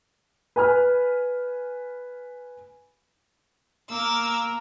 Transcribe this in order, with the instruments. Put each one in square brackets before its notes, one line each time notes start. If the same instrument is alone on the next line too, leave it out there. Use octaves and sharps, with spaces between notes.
[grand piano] B4 G#5 B5 F6
[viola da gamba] A#3 A#4 [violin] D6 E6